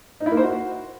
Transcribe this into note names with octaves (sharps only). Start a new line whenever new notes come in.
D#4
E4
A#3
C5
F#4